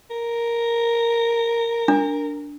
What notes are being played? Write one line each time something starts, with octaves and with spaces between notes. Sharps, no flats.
A#4
D4